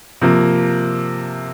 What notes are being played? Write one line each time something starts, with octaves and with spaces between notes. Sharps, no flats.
C3 F3 A#3